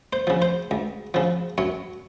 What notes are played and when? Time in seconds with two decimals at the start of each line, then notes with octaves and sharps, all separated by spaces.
0.13 C5
0.27 C#3 F3
0.42 C5
0.71 C#2
1.14 C#3 F3
1.58 F#2 C#5